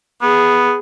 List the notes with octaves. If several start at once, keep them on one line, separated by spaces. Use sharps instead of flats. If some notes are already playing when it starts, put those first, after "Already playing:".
B3 G#4